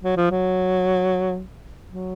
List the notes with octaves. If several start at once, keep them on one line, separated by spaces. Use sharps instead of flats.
F#3
F3
F#3
F#3